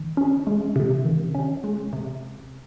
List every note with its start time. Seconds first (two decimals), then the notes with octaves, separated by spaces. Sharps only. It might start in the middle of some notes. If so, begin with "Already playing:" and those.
Already playing: D#3
0.17 C#4
0.47 G#3
0.76 C3
1.05 D#3
1.35 C#4
1.64 G#3
1.93 C3